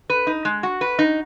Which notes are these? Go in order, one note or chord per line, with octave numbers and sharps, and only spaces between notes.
B4
D#4
G#3
F#4
B4
D#4